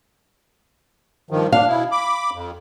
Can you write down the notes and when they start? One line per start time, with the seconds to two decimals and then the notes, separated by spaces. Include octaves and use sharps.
1.31 G2 D#3 F3
1.52 D4 F5
1.67 B2 E4
1.92 B5 D6
2.33 F2